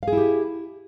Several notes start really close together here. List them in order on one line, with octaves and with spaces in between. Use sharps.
F5 G#4 E4 G4